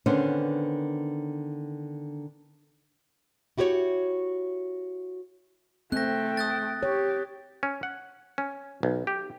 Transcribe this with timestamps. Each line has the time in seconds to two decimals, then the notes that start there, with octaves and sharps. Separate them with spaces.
0.06 D3 D#3 B3 C#4 D4 C5
3.58 E4 F#4 G4 B4 C#5
5.92 A3 C4 G5 F#6 A#6
6.37 D#6 F#6 A6
6.83 G4 C#5
7.63 C#4
7.83 F#5
8.38 C#4
8.83 B1
9.07 G4